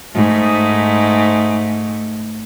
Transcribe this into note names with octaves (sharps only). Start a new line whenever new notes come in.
G#2 A3